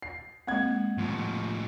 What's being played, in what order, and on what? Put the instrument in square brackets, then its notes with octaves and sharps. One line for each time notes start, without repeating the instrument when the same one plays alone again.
[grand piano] C7
[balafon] G#3 A#3 C4 [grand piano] F#5 G#6
[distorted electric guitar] A2 F3